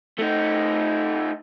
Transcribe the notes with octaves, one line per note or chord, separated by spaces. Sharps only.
A3 D#4